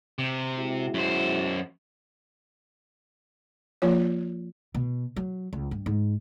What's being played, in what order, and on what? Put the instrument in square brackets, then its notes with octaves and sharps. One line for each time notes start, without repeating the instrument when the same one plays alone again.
[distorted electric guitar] C3
[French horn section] G#3 E4 F#4
[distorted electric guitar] F#2 C5
[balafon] F3 A#3 F4 C#5
[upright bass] B2
F#3
C#2
G2
G#2